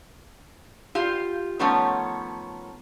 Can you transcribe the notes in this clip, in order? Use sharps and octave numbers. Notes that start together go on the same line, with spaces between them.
F4 G4 F5
D#3 F3 A3 B3 C#4 C#5